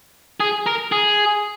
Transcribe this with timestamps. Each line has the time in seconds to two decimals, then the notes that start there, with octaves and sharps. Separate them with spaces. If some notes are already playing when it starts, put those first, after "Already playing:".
0.40 G#4
0.66 A#4
0.92 G#4